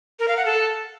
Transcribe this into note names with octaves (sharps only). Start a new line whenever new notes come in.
A#4
F5
F#5
A4